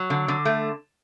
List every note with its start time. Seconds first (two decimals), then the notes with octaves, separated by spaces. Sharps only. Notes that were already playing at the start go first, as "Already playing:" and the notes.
Already playing: F#3
0.10 D3
0.28 D3
0.45 A3